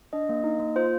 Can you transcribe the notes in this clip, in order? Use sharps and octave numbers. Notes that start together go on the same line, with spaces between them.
D4 D#5
A#3
D#4
A#3
F4 C5